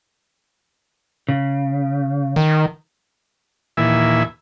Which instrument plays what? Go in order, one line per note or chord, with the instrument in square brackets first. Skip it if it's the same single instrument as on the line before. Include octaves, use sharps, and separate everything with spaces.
[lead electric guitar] C#3
[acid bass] D#3
[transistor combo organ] D#2 A#2 E3 E4 E5 G#5